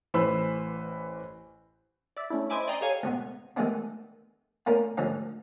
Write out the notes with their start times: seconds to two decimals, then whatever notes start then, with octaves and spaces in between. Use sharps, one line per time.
0.14 A1 E3 B4 C5 B5 E6
2.17 D5 E5
2.30 A3 C#4 D4 E4
2.50 C5 D#5 E5 G#5 B5 D6
2.68 D5 D#5 G5 A#5 C6 D#6
2.81 G4 A4 C#5 F5 G#5
3.03 C#2 B2 B3
3.57 D#3 E3 G#3 A3 B3 D4
4.66 A3 A#3 C#4 D4 A#4
4.97 D2 G#2 D3 F3 C#4 F5